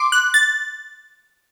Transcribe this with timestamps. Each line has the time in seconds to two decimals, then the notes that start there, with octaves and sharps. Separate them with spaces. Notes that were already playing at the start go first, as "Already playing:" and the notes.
Already playing: C6 D6
0.12 F#6
0.34 A6